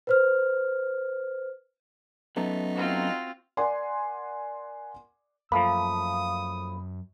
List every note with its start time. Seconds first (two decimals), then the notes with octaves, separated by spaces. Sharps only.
0.07 B4 C5 F6
2.37 F#2 A3 B3 D#4
2.74 C4 F4 F#4
3.57 A#4 D5 F#5 G#5 C6
5.52 F#2 F3 A3 A#3 B5 D#6